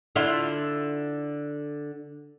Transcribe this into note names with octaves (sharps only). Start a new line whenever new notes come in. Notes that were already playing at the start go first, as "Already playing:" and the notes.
D3 E4 F4